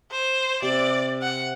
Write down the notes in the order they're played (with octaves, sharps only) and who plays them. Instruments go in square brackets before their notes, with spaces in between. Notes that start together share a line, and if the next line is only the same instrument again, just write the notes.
[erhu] C5
[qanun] C3 [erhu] D5
[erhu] F#5